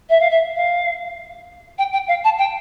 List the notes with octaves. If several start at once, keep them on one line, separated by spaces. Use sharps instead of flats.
E5
F5
E5
F5
G5
G5
F5
A5
G5